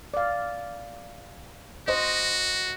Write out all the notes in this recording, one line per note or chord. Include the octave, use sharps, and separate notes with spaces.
D5 F5
F#4 C5 D#5